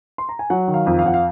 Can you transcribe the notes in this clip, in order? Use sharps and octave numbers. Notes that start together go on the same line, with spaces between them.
C6
A#5
G#5
F#3 F#5
D#3
F5
F2
F5
F2 F#5
F5